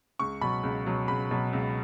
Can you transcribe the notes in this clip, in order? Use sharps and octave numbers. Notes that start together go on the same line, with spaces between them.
C#2 C#6
B2 F#3 B5
C#2
B2 F#3
C#2 B5
B2 F#3
C#2